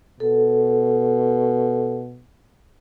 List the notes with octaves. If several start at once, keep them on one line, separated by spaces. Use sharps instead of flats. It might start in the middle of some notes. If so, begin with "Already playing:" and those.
B2 A4